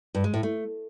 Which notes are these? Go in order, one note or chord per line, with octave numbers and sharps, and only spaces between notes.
G2
G#3
A2
A3